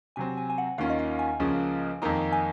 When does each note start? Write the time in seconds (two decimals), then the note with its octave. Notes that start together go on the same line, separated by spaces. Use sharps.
0.16 C3 F#3 C4 G#5
0.37 G#5
0.50 G#5
0.58 F#5
0.78 D#2 D#3 A#3 C#4 F4 F5
0.90 D#5
0.99 F5
1.19 G#5
1.39 C#2 C#3 F3 A#3 C#4
2.02 F2 D#3 A#3 D#4 A#5
2.32 G#5